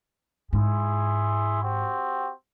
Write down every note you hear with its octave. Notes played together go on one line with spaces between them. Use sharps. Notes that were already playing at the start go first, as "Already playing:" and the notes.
G#2 E4 G#4 C6
C4 F#4 G4